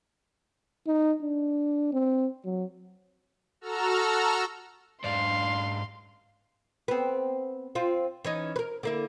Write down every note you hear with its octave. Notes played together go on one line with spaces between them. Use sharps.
D#4
D4
C4
F#3
F#4 A4 A#5 E6 F6
G#2 D4 F5 C6
B3 C4
C4 F4
E3 C#4 D#4
A#4 B4
D3 A#3 E4